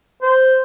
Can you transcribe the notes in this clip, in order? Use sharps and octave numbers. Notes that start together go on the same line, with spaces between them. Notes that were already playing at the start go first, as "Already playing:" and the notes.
C5